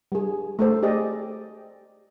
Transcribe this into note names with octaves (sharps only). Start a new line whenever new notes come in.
G3 G#4
A3 A4 C5
G4 G#4 D5 D#5